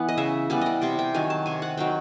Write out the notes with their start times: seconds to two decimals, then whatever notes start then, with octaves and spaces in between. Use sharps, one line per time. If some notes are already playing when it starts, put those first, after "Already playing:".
Already playing: E3 B3 F#5
0.08 D#5
0.18 C#3 E5
0.50 E3 G3 B3
0.61 D5 D#5
0.82 C3 G5
0.99 G5
1.14 D#3 F#3 G#5
1.30 A5
1.46 C3 G#5
1.62 F#5
1.77 D#3 F#3 G5